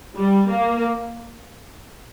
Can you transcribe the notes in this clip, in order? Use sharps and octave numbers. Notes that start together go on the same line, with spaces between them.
G3
A#3